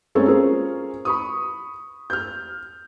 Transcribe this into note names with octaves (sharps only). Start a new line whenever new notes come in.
G#3 A#3 C4 C#4 A4
C#4 F4 G#4 A#4 C5
B5 C#6 D#6
F6 G6